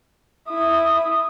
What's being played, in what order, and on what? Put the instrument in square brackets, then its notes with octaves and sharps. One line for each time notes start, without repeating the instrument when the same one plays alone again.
[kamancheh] E4 D#6